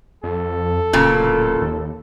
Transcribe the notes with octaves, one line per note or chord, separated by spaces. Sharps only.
F2 A4
D1 A#2 C#3
D#2